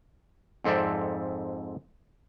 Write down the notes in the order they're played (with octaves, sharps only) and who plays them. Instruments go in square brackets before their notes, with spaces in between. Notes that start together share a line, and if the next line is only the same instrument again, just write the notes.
[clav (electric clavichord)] F2 G#2 C4 A4 D5 E5